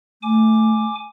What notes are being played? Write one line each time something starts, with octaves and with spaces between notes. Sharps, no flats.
A3 G#5 D6